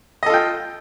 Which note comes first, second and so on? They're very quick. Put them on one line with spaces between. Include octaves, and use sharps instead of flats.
D#5 A4 F4 G5